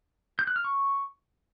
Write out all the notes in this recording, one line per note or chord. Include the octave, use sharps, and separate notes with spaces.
G6
F#6
F6
C#6